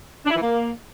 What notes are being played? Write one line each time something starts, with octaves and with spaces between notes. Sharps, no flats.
D4
E4
E3
A#3